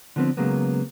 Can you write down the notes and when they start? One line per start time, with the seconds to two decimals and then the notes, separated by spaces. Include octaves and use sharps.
0.16 D3 F3 B3 C4 B4
0.37 C#3 F#3 G#3 A#3 B3